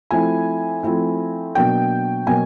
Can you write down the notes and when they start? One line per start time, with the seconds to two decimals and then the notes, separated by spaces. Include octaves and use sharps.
0.11 F3 A3 C4 E4 G#5
0.83 F3 A3 C4 E4
1.55 B2 F#3 A#3 D4 G5
2.27 B2 F#3 A#3 G#5